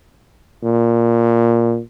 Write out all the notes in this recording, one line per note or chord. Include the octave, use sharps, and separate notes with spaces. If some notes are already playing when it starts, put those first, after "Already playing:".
A#2